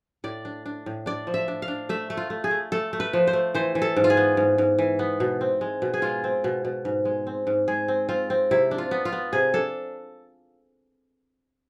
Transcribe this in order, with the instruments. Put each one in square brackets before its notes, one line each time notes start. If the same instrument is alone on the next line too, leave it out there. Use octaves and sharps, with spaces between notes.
[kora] A2 D5
D4
D4
A2
D4 D5
F3
E5
D4
F5
D4
A3 E5
A3
F4
A3
G#4
A3
A3 A4
A3
B4
F3
C5
A3
E3 C5
E3
A4
G#2
F4
G#4
B3
G#2
G#2
E3
B3
B2
C4
G#3
B2
G#4
G#3 F4
C4
B2
B2
G#2
G#3
C4
G#2
G#3 G#4
C4
C4 F4
C4
C3 E4
D4
F4
B3
F4
B3
C3 G#4
D4 A4